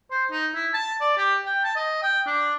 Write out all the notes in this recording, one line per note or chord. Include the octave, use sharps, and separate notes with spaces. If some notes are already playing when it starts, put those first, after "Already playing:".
C5
D#4
E4
A5
D5
G4
G5
A5
D#5
G5
D4